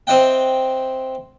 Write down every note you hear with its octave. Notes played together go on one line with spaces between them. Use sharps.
C4 E4 D#5 F#5 G5